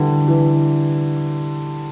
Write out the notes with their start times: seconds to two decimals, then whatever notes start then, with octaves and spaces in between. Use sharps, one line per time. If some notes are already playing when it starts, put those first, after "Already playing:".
Already playing: D3 E3 G3
0.28 E3